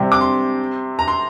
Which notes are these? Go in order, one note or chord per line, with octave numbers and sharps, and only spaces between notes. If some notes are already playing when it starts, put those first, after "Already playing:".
Already playing: C3 G3 C4
D6
C6
A#5
C6